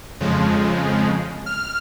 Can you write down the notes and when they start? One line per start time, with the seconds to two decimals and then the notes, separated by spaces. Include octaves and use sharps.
0.20 F2 C#3 F3 G#3
1.46 F6